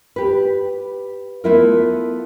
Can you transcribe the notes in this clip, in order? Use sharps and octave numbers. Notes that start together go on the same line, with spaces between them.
G4 B4
A3 B3 E4 F4 A#4